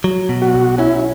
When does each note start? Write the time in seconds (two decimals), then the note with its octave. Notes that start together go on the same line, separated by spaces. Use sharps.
0.04 F#3
0.29 B2
0.42 F#4
0.54 B1
0.78 C#4 E4